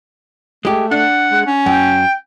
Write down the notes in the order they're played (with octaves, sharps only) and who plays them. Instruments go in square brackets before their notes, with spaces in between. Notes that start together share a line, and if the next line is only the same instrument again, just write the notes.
[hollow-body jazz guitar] G#3 G4 [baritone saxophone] A3
[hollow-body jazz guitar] D4 [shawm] F#5
[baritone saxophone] G#3
C#4
[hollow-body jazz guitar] F#2 [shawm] G5